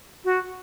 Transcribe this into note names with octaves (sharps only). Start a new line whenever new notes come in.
F#4